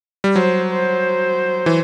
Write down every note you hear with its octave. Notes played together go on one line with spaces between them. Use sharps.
G3
F#3 C5
C5
E3